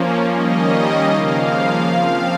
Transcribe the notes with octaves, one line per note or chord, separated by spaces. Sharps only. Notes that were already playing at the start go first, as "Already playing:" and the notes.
Already playing: F3 A#3 C#4
D#3 G3 A#3 C#4 D#5
C#3 F3 A#3 F5
F3 C4 F5